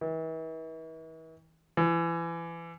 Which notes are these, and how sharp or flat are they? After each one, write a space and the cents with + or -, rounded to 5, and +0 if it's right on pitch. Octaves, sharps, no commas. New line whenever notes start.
E3 -40
E3 +30